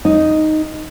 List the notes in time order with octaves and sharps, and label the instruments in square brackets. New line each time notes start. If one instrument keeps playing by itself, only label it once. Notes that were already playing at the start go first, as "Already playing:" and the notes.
[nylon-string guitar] D#4